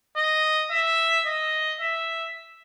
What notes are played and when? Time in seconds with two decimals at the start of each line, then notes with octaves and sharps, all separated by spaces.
0.17 D#5
0.71 E5
1.26 D#5
1.81 E5